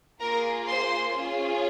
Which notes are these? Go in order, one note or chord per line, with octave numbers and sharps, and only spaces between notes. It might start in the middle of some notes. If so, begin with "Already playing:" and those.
A#3 F4 G#4 A#4 A#5
C5 C6
C#4 F4 G#4